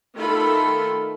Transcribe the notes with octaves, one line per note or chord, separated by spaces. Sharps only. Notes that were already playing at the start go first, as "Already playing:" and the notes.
D#3 A3 F4 A4 B5